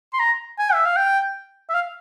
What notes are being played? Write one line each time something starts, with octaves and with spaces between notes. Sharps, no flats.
C6
A#5
G#5
E5
F5
G5
E5
F5